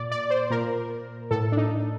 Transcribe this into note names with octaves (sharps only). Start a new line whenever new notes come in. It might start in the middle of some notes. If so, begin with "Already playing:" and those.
Already playing: A#2 D5
D5
C5
A#2 A#4
A2 A4
D4
D#4